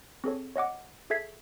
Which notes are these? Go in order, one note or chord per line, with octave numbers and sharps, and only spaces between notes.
C4 G#4 A4 C#5
C#5 D#5 F#5 D6
G#4 A4 E5 G#6 B6 C7